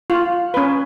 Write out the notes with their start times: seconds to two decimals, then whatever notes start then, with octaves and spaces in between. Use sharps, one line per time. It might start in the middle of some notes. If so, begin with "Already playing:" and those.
0.10 F4
0.54 C#4 B4